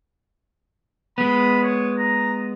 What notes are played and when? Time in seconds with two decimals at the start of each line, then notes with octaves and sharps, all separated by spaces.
1.18 G#3 B3 B5
1.63 C#5
1.98 A#5